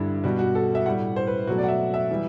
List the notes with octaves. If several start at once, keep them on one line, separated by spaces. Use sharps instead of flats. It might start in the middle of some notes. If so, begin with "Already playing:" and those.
Already playing: G2 D3 G3 E4
B2 G3 F#4
F#4
A4
E5
A2 G3 F#5
C5
B4
B2 F#3 A3 F#4
D5
F#5
E5
E5
E3 G3